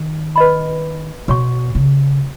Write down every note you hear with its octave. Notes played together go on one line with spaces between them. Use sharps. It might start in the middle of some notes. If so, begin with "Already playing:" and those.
Already playing: D#3
B4 D#5 B5
B2 F#4 C#5 F#5 C#6
C#3